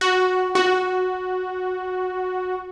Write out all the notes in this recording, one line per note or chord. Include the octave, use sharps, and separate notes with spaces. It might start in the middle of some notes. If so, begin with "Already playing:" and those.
F#4
F#4